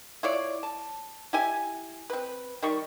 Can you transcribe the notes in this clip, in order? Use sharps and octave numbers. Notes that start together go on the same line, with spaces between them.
E4 F4 C#5 D5
A5
E4 G4 G#5
C4 B4
D#3 G3 C#6